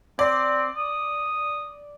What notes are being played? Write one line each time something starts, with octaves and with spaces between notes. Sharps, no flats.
C4 D5
D#6